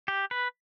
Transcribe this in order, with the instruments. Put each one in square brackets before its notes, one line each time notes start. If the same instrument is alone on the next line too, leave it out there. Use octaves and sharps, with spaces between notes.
[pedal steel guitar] G4
B4